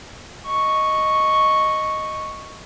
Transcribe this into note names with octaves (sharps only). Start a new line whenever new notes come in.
D#5 C#6